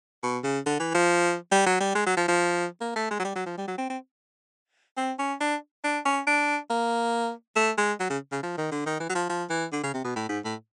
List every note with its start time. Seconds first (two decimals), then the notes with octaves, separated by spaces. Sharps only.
0.23 B2
0.44 C#3
0.66 D3
0.80 E3
0.94 F3
1.52 G3
1.66 F#3
1.80 G3
1.95 G#3
2.07 F#3
2.17 F3
2.28 F3
2.81 A#3
2.96 A3
3.11 G#3
3.19 F#3
3.24 G3
3.36 F#3
3.46 F3
3.58 G3
3.68 F#3
3.78 C4
3.90 C4
4.97 C4
5.19 C#4
5.40 D4
5.84 D4
6.05 C#4
6.27 D4
6.70 A#3
7.56 A3
7.78 G#3
8.00 F#3
8.10 C#3
8.32 C#3
8.43 F3
8.57 D#3
8.72 D3
8.86 D#3
9.00 E3
9.09 F#3
9.15 F3
9.29 F3
9.50 E3
9.72 D3
9.83 C#3
9.94 C3
10.04 B2
10.16 A2
10.29 G#2
10.44 A2